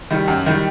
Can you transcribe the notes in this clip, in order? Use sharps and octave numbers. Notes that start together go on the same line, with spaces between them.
D#3 G3
F#2
D#3 G3